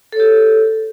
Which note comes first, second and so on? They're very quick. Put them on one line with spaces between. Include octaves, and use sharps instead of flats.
A4 C#5 G4